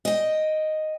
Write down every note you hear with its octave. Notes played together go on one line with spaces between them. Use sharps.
D#5 G5